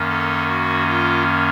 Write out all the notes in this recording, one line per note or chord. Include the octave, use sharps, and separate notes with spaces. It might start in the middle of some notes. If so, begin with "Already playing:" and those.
Already playing: F#2 D#3 A#3 C#4
A4
F#4
F4